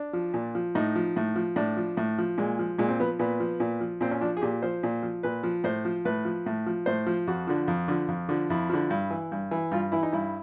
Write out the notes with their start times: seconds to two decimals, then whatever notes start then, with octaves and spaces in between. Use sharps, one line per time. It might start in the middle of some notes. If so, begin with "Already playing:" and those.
Already playing: D4
0.13 F3
0.34 A#2
0.55 F3
0.75 A2 D#4
0.95 F3
1.16 A2
1.36 F3
1.56 A2 D4
1.77 F3
1.97 A2
2.18 F3
2.38 A#2 G#3
2.59 F3
2.78 A#2 G#3
2.89 C4
3.00 F3 B3
3.19 A#2 B3
3.40 F3
3.60 A#2
3.81 F3
4.01 A#2 C4
4.11 C#4
4.21 F3 D4
4.37 G#4
4.41 A#2 G4
4.62 F3 C5
4.83 A#2
5.03 F3
5.23 A#2 B4
5.43 F3
5.64 A2 C5
5.85 F3
6.05 A2 B4
6.25 F3
6.46 A2
6.66 F3
6.86 A2 C5
7.07 F3
7.27 F2 F#4
7.47 D3 F3
7.68 F2
7.88 D3 F3
8.08 F2
8.29 D3 F3
8.50 F2 E4
8.70 D3 F3
8.90 G2
9.11 E3
9.32 G2
9.51 E3
9.71 G2 F4
9.92 E3 E4
10.03 D#4
10.12 G2 E4